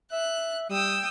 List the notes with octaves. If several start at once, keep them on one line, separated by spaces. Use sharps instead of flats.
E5 F#6
G3 G5 D#6 E6